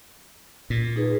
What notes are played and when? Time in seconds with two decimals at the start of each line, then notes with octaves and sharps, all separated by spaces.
0.70 A#2
0.96 D#4 G#4 B4